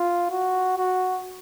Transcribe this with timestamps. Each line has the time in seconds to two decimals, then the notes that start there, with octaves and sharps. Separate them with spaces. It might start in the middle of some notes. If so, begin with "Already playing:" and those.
Already playing: F4
0.31 F#4
0.77 F#4